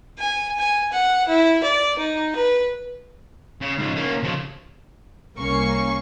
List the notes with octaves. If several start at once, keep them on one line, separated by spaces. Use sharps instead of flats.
G#5
G#5
F#5
E4
D5
D#4
B4
C#3
G#2 C#3
A#3 C#4
C#3 F3
C2 A#3 C#4 C#6 C7